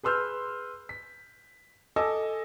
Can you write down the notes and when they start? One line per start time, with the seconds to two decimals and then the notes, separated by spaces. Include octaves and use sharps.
0.03 G#4 B4 C6 E6 F6 G6
0.89 B6
1.96 A4 D#5 G#5 D6 E6